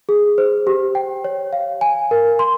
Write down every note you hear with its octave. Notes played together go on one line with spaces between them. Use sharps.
G#4
C5
G4
G5
C#5
F5
G#5
A#4
C6